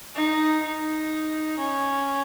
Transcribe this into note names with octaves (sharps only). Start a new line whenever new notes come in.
D#4
D#4
C#4